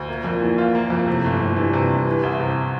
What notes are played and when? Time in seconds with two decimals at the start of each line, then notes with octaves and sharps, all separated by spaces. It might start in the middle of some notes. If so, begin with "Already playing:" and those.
Already playing: D2
0.08 A#2 A#3
0.24 F2
0.41 E3
0.58 F4
0.75 A#3
0.90 F2
1.07 A2 C3
1.24 G1
1.40 F2
1.56 G2 E3
1.73 C3
1.90 G1
2.06 E3
2.23 C2
2.39 C3